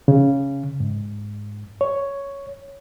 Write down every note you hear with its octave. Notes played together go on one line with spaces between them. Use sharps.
C#3
G#2
C#5